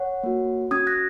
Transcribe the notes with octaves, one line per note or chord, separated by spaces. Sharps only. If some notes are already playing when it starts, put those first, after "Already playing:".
Already playing: C#5 F#5
A#3 F#4
C#4 F#4 D#6 G#6
F#6 A#6